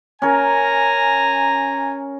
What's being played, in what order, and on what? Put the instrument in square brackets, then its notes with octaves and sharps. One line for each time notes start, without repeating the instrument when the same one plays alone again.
[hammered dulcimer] C#4 A#4 [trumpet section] G#5 A#5